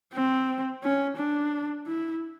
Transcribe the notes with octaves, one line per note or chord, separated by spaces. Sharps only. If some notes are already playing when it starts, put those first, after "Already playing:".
C4
C#4
D4
E4